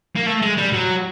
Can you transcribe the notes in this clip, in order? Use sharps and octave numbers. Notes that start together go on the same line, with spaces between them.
A#3
A3
G#3
G3
F#3